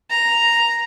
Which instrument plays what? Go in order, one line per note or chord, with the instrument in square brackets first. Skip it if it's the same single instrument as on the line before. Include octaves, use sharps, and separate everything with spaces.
[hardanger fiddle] A#5